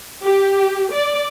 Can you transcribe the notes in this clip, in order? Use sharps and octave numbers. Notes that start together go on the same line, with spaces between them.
G4
D5